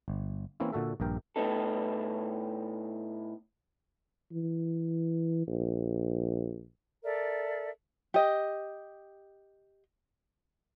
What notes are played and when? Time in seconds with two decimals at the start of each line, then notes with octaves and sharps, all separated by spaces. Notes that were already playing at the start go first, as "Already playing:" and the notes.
0.08 G1
0.60 E3 A#3 C4 C#4 E4
0.72 A#2 D3 F#4 A4 E5
1.00 A#1 G2 A#4 G5
1.36 A2 B3 D#4 A4
4.32 E3
5.48 A#1
7.03 A4 A#4 D5 E5
8.14 G4 D#5